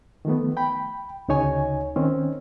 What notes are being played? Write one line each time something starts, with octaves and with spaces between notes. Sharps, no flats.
D#3 F3 A3 B3
G5 B5
D2 C#3 D#4 C#5 G#5
D#3 C4 C#4